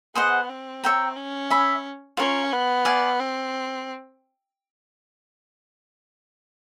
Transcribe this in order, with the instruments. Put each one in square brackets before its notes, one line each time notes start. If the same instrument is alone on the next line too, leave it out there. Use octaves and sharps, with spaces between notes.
[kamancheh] B3 [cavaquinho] G#4 C5 D#5 F#5
[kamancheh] C4
[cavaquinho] C#5 E5 G5 A#5
[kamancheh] C#4
[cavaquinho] C#5 E5 G#5 B5
[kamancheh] C#4 [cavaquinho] F4 A#4 C#5
[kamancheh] B3
[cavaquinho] D5 F5 G#5
[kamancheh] C4